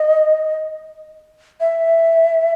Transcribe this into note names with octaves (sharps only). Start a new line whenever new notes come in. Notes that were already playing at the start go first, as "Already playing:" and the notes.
Already playing: D#5
E5